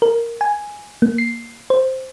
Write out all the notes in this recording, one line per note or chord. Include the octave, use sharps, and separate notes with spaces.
A#4
G#5
A#3
C7
C5